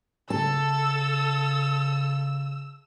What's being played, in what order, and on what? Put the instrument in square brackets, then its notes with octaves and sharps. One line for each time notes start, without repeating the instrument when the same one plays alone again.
[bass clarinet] C#3 [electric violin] A4 [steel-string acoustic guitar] A5 [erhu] E6